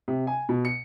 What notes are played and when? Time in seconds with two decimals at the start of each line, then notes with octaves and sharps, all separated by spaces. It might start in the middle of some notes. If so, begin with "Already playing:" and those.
0.08 C3
0.27 G#5
0.49 B2
0.65 C#7